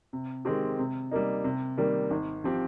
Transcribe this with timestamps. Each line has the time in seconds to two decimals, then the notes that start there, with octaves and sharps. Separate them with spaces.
0.13 C3
0.45 D#3 G#3 C4 G4
0.79 C3
1.11 G3 A#3 D#4
1.44 C3
1.77 D#3 G3 A#3
2.11 G#1
2.44 F3 C4 G4